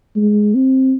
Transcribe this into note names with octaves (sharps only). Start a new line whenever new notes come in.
G#3
C4